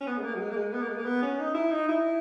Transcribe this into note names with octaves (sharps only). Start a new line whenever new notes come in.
C#4
B3
G#3
A#3
F#3
G#3
A#3
G#3
B3
A#3
G#3
A#3
B3
C#4
D#4
E4
D#4
E4